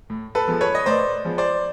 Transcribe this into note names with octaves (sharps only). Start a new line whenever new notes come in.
A2
A4 B4
F3 G#3 B3
B4 C#5
D#5
A2 C5 D5
F3 G#3 B3
C5 D5